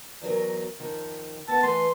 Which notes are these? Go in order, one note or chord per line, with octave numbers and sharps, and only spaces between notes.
E2 F#3 A#4
F2 D#3
B3 F#5 A5
E3 A3 B4 C6